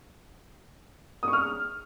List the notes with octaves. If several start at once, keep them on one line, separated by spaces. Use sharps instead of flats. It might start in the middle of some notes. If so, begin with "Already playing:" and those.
D#6
C#6
F6